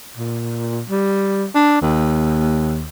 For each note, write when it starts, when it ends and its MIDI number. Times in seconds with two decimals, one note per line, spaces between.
0.17 0.82 46
0.90 1.47 55
1.55 1.80 62
1.82 2.88 39